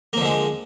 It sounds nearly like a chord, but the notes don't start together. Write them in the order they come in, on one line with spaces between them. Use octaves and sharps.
A#3 F3 D3 G#3